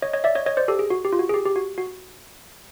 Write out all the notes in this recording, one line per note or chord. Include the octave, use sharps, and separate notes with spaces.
C#5 D#5
C#5 D#5
D5 E5
C#5 D#5
C#5 D#5
C5 D5
G4 A4
G#4
F#4
G4
F4
F#4
G#4
G4
G4
F#4
F#4